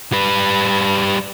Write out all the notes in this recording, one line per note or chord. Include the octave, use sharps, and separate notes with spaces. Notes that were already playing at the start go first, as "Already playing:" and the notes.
G3 B4